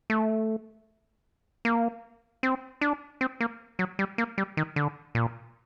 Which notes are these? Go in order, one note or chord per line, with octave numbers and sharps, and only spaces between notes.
A3
A#3
C4
D4
C4
A#3
F#3
G3
A#3
G3
D#3
D3
A#2